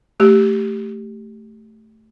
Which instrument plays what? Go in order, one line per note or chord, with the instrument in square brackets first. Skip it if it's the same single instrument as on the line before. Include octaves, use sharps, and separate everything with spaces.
[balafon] A3 G4